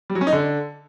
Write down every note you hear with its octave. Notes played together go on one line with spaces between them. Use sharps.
G3
F#3
C#4
D#4
D3